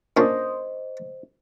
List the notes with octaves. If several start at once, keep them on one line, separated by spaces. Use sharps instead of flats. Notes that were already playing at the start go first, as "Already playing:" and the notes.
A#2 C#4 D4 C5 D#5